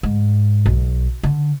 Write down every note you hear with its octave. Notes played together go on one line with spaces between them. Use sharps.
G#2
B1
D3